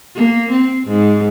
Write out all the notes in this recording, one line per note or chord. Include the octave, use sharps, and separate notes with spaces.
A#3
C4
G#2